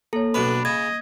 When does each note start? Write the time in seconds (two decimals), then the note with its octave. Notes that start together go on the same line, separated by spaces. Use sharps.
0.13 A#3 A4 C#5
0.34 B1 D4 B4 B5
0.65 C#3 D#5 G#6